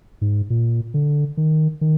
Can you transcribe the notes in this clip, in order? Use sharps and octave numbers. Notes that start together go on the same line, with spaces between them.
G#2
A#2
D3
D#3
D#3